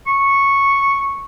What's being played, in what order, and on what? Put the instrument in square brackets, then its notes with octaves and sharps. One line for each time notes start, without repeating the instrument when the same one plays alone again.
[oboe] C#6